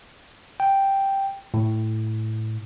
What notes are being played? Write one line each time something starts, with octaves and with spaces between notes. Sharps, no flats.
G5
A2